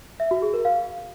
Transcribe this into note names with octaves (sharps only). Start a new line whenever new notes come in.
E5
F#4
G#4
A#4
F5